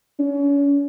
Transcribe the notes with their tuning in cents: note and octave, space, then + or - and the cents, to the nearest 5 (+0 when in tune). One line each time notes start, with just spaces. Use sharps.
C#4 +35